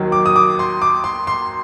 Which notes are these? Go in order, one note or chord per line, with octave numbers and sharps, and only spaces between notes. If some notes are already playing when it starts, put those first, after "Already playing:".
Already playing: D#2 D#3 F#3
D6
D#6
D6
C6
D6
C6
C6